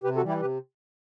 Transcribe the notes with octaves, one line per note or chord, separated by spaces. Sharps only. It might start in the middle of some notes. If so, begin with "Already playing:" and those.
C3 G4 B4
F#4 A4
E3 G3
E4 G4
C3 G4 B4